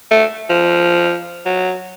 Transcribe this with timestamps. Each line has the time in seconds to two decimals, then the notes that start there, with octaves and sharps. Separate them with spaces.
0.11 A3
0.50 F3
1.45 F#3